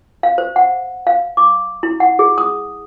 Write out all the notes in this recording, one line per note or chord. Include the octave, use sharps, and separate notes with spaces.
F5
C5
F#5
F5
D6
E4
F#5
G#4
D#6